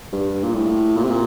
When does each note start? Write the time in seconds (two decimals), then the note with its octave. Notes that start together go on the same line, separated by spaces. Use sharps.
0.13 G2
0.43 A#2
0.55 A2
0.96 A#2
1.03 C3
1.10 A#2